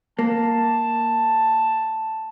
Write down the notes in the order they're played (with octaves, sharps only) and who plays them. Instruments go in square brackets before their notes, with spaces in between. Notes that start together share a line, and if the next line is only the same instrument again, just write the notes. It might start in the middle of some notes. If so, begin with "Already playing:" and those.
[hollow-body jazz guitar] A#3 [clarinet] A5